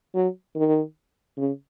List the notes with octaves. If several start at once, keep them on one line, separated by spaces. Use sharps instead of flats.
F#3
D#3
C#3